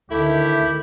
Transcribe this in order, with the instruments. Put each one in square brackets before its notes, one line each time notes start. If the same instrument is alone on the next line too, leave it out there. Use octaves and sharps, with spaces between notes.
[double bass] D2 D#3 [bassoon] A3 [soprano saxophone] E4 [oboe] G4